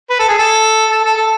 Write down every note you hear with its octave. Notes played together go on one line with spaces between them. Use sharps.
B4
A4
G#4
A4
A4
A4
A4